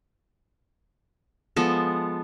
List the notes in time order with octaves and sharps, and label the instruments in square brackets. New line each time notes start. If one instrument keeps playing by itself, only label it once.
[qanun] F3 G#3 B3 A4